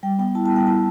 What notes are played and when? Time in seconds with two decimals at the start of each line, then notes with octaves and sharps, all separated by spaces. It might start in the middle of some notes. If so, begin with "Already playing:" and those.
0.03 G3 G5
0.19 B3 G5
0.35 E4 A5
0.46 A5
0.51 G3 G5
0.67 E4 A5